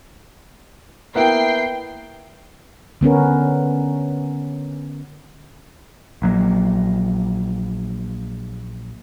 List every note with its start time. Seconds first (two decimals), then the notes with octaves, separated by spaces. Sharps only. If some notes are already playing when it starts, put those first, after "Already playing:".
1.15 A#3 B3 E4 G5 C7
3.01 D3 B3 C#4 A#4
6.22 A#1 F#3 A#3